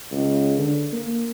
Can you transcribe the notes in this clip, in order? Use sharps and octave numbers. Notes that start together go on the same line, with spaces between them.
C#2
D3
A#3